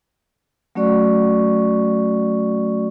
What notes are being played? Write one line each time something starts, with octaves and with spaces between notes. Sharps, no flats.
F#3 A3 C#4 F#4 D5 C#6